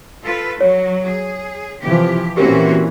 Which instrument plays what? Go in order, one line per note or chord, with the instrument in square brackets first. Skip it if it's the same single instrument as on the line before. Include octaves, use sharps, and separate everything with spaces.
[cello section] F4 A4 B4
[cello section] F#3 [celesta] C#5
[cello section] G#4
[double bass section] C3 E3 F3 [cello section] G4
[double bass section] A#2 E3 A#3 [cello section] C4 C#4 F#4 [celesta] G4 A#4